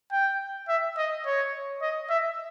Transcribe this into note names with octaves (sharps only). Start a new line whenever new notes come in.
G5
E5
D#5
C#5
D#5
E5